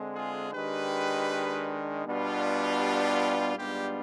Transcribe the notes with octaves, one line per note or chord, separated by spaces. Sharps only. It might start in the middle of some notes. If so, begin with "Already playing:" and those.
Already playing: D3 G#3 C4
F4 G#4
D#3 G#3 D4 G4 B4
B2 G3 B3 D4 F4
G4
G#2 G3 B3 D4 F4 G4